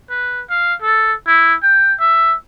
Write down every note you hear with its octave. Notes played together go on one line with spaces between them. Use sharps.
B4
F5
A4
E4
G5
E5